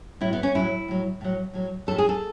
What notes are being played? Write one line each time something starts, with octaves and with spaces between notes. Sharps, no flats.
A2 F#3 E4
B3
C#4
A2 F#3 E4
A2 F#3
A2 F#3
A2 F#3
A2 F#3 A4
G#4
A4